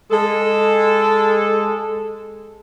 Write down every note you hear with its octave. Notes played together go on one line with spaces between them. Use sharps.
G#3 A4